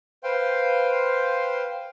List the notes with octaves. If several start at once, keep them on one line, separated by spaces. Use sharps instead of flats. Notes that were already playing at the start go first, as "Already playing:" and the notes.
B4 C5 F5 G5 C6